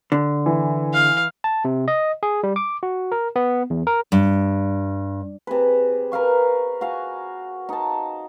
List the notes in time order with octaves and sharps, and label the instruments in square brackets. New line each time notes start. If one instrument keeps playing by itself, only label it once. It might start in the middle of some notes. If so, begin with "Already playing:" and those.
[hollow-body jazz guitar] D3
[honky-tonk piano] E3
[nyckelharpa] F5
[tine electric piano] A5
C3
D#5
G#4
G3
D6
F#4
A#4
B3
E2
A#4
[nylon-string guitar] G2
[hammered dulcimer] C3 G#4 B4
A#4 B4 F5 C#6
F#4 F5 G#5
D#4 A5